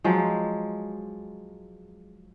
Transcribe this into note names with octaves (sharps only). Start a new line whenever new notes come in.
F3 F#3 G#3